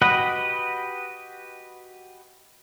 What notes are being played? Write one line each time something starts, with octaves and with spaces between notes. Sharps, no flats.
F#4 G4 B4 D#5 F#5